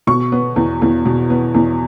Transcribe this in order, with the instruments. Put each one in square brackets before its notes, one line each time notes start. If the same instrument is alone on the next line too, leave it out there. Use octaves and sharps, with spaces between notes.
[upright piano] B2 C#6
B3
E2
E2
B2
B3
E2